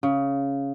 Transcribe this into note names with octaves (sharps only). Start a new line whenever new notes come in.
C#3